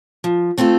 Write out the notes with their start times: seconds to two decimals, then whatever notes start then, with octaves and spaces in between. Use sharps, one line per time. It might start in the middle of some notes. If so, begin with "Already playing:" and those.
0.24 F3
0.58 A3 C4 F4 A4